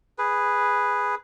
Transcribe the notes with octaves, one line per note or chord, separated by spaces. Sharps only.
G#4 B4